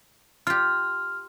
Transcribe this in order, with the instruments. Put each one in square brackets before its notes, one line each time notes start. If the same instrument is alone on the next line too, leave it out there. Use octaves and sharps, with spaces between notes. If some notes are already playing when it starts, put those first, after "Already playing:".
[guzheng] F4 G4 [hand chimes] F6